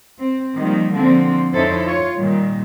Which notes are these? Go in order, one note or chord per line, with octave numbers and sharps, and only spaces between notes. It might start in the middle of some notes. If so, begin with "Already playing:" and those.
C4
D#3 F3 G3 A#3
D3 F3 A#3 C4
F2 C#4 D#4 E4 A4 C5
F4 C#5
A#2 D#3 G3